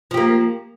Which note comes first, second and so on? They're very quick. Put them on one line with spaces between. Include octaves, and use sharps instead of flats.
F3 G4 A#3